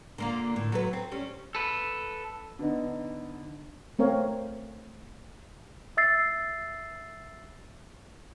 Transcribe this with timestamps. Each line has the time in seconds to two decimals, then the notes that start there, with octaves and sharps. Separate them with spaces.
0.18 D3 A#3 F4
0.56 A2
0.72 F#3 A4 B4
0.93 C4
1.12 G3 C#4
1.55 A4 B4
2.59 D3 B3 D#4
3.99 A3 C4 A#4 C#5 F5
5.97 E5 E6 A6 C7